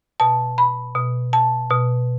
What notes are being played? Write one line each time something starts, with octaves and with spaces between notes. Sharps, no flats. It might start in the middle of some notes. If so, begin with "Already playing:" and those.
B2 A5
B5
B2
A5
B2